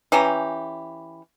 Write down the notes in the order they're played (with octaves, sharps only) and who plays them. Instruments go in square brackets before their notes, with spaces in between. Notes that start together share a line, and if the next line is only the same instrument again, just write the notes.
[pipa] E3 C#4 G4 A#5